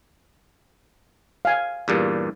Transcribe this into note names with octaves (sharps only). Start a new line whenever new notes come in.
F5 G#5
E2 G2 A#2